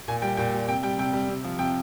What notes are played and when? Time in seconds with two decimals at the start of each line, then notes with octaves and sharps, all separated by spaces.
0.08 A#2 G#5
0.22 G3 G5
0.37 A#2 G5
0.53 G3
0.68 C3 G5
0.83 G3 G5
0.98 C3 G5
1.13 G3
1.29 C3
1.44 F3
1.59 C3 G5